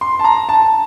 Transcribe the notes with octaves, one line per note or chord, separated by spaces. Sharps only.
C6
A5
A#5
A5